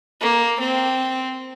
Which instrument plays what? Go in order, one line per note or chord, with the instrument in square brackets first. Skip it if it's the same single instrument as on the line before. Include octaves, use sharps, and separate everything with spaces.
[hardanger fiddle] A#3
C4